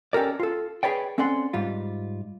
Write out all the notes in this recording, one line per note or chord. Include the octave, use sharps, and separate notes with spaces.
C#4 G4 A4 A#4 D5
F4 A4
G#4 B4 C#5 D5 G5
C4 C#4 A4 D5 F#5 C6
G#2 G3 F4